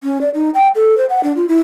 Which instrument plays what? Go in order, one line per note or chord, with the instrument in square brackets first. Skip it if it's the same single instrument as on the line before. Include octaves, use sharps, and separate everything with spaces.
[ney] C#4
D5
D#4
G5
A4
C5
F#5
D4
F4
E4